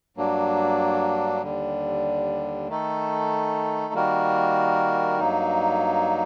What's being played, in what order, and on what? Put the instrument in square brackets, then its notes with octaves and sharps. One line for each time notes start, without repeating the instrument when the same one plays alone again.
[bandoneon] G2 F#3 A#3 D4
D#2 D3 G3
D#3 A3 D#4 A4
D#3 G3 A#3 F#4 A#4
G2 F#3 A#3 D#4